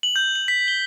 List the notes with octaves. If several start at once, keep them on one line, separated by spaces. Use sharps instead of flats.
F#7
G6
F#7
B6
G7